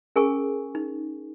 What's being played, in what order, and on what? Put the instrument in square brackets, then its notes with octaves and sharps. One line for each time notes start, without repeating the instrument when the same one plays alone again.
[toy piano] C#4 G#4 A#4 G#5 A5 C#6
D#4